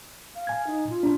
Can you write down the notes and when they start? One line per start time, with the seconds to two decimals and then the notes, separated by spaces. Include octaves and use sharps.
0.35 F5
0.47 G#5 G#6
0.67 D#4
0.90 F4
1.03 D4